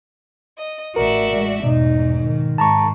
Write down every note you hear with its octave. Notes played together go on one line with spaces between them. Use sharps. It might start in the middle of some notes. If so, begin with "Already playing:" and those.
D#5
A1 A2 F#4 A#4 D5 E5
G#3
E2 G#2 B2 D#4
D#3
G#2 A5 A#5 C#6